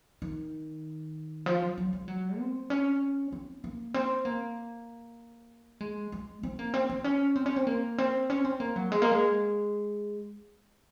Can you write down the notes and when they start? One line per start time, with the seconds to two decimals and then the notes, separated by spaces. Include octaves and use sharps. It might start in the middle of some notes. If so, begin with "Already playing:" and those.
0.22 D#3
1.46 F3
1.62 F#3
1.78 F#3
1.93 G#3
2.08 F#3
2.39 C4
2.70 C#4
3.32 C4
3.64 A#3
3.94 C4
4.25 A#3
5.81 G#3
6.12 G#3
6.43 C4
6.59 A#3
6.74 C4
6.90 C4
7.04 C#4
7.36 C4
7.46 C#4
7.56 C4
7.67 A#3
7.98 C4
8.30 C#4
8.45 C4
8.60 A#3
8.76 F#3
8.92 G#3
9.02 A#3
9.11 G#3